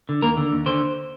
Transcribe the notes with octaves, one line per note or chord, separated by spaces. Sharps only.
D3
D#2 A#3 A#4
D3
D#2
D3 C5